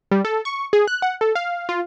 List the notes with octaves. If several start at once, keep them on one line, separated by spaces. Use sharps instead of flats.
G3
A4
C#6
G#4
F#6
F#5
A4
F5
F4